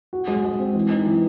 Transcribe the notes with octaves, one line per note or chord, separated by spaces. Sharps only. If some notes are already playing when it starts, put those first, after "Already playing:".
F#4
G#3
G#3
C4
E3
D#4
E3